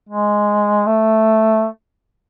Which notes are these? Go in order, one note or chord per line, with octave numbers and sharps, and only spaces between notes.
G#3
A3